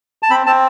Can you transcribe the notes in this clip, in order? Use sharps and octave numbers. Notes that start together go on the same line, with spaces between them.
A5
C4 B5
C4 A5